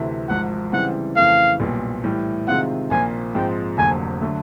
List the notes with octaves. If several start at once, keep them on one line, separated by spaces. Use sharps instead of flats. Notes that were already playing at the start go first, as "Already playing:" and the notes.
Already playing: D2 C3 E3 A3 C4
G#1 G#2 F3 F#5
C#3 E3 G3 C4 F#5
F2 C#3 E3 A3 F5
B1 A#2 G3 B3
A2 E3 G3
C3 D#3 G#3 C4 F4 F#5
A#1 A#2 F3 A#3 G#5
G#2 F3 G#3 C4 G5
F1 F2 D3 F#3 A#3 G#5
D3 F#3 A3